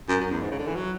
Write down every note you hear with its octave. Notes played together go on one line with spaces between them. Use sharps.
F#2
F#2
E2
G#2
C#3
D3
E3
F#3